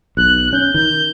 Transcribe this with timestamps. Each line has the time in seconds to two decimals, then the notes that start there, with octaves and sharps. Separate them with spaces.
0.17 B1 F#6
0.53 C#4 G6
0.74 D#3 G6